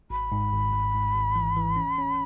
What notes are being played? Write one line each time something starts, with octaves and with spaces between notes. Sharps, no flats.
G#1 B5
G#2
G#1
G#1
G#2
G#1
E3
E3
C#4
C#4